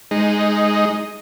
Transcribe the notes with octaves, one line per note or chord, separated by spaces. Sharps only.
G#3 D#4